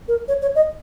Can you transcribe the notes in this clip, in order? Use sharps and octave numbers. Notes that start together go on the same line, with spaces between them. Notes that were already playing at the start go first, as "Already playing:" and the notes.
A#4
C#5
C#5
D#5